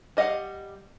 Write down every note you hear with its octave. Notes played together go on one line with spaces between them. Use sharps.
G3 D#5 F5 F#5